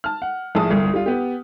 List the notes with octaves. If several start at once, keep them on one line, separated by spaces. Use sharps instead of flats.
A5 F6
F#5
A#1 A2 G#4 A5 D#6
G1 C2
G3 F4
B3 G4